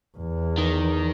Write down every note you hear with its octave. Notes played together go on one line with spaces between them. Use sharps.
E2
D#3